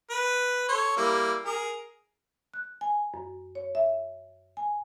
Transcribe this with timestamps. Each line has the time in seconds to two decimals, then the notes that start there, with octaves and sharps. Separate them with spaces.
0.10 B4
0.69 A4 C#5 C6
0.96 G3 A#3 E4
1.45 G#4 A#4
2.54 F#6
2.81 G#5
3.14 F#2
3.55 C#5
3.75 E5
4.57 G#5